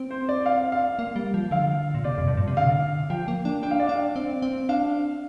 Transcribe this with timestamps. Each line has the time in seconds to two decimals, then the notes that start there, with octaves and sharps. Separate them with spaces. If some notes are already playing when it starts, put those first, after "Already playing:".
Already playing: C4
0.11 C5
0.29 D5
0.46 F5
0.72 F5
0.99 A#3
1.16 G3
1.34 F3
1.51 D3 F5
1.95 A#2
2.04 C3 D5
2.18 F2
2.28 G2
2.37 A#2
2.48 C3
2.57 D3 F5
3.10 F3 G5
3.28 A#3
3.45 D4
3.63 D4 G5
3.71 F5
3.80 D5
3.87 D4 F5
4.16 C4
4.42 C4
4.69 D4 F5